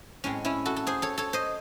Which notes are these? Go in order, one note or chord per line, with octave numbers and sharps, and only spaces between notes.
A2 G#3 C4 C#4
C#4 E4
F#4 A4
A4
G#4 C5
A4 C#5
A4 C#5
C5 D#5